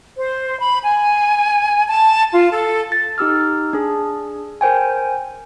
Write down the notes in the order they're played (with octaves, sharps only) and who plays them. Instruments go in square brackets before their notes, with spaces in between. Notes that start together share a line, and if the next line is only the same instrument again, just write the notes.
[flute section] C5
B5
G#5
A5
F4
A4
[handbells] A6
D#4 G4 E6 F6
D4 G#4
A#4 C5 G5 G#5